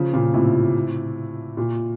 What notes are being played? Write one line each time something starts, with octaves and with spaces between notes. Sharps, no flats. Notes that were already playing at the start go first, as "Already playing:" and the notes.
Already playing: C#3 F3
A#2 C#3
A2 C3
A#2